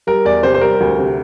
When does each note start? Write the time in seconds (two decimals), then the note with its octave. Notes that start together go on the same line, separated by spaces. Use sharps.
0.07 G3 A#4
0.25 E2 D5
0.43 C3 C5
0.54 C5
0.61 G3 A#4
0.80 D2
0.98 C3